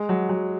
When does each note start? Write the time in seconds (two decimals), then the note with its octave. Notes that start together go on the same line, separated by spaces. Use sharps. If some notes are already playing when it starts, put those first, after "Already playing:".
Already playing: G#3
0.09 F#3
0.29 F#3